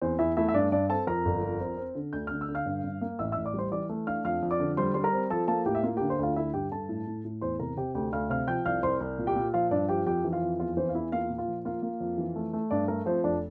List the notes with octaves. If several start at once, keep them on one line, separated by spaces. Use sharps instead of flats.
E2 C4 C5
E2 E4 E5
A3 E4 E5
E5
G2 D4 D5
G2 D4 D5
C4 A4 A5
F2 A#4 A#5
G1
F2
C4
C4
D3
D2 G6
D3 F6
E6
D3
F5 F6
G2
G2
A#3
A1 E5 E6
A1 E5 E6
D5 D6
G3 C5 C6
E3 D5 D6
A3
D4 F5 F6
F2 F5 F6
F2
D5 D6
D3
G3 C5 C6
G3 C6
A#4 A#5
C4
F3 A4 A5
A#3 A4 A5
A2 G4 G5
E5
A#3 F4 F5
D3 G4 G5
C5 C6
D2 F4 F5
D3 E4 E5
G2 G4 G5
G2 A4 A5
A2
A2
A2
E2 C5 C6
C3 A#4 A#5
C3 G4 G5
D2 G4 G5
D2 F5 F6
C3 F5 F6
F3 G5 G6
C2 F5 F6
C2 C5 C6
C2
A#2
G4 G5
A#2
F3 F4 F5
G2 D4 D5
F3 G4 G5
F2 G4 G5
E3
F4 F5
F2
E2 F4 F5
E3 C4 C5
F5
E2 E4 E5
A#3 F4 F5
A#2
F4 F5
F3
A#3 F4 F5
A#3
F2
E3
A3
A3
G2 D4 D5
A3 A#4
F3 C4 C5
F1 D4 D5